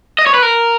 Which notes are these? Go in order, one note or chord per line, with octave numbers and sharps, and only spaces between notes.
D#5
C#5
B4
A#4